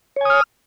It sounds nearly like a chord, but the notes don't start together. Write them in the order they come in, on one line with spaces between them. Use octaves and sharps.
C#5 G#5 D#6 F6